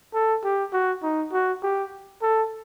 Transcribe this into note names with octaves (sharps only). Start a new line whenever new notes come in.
A4
G4
F#4
D#4
F#4
G4
A4